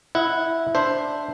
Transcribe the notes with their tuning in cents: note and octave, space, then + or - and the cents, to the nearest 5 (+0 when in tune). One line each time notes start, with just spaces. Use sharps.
E4 +0 D#5 +45 F#5 -5
D4 +0 C5 +0 E5 +0